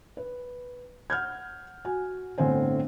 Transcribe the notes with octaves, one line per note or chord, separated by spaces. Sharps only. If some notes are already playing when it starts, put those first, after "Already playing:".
B4
F#5 F6 G6 G#6
F#4 G#5
G1 A2 D3 C4 C5 G#5